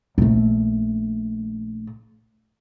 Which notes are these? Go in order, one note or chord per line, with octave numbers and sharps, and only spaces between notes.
A#1 A3